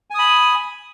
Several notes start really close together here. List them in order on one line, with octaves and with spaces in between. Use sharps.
G#5 D#6 B5